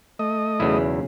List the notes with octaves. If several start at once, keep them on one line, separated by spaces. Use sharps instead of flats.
A3 D#5
B1 E2 C#3 E4